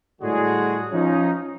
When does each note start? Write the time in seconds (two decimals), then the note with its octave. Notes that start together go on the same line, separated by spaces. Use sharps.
0.22 A2 D3 G3 G#3 F#4 G#4
0.92 F3 C#4 D#4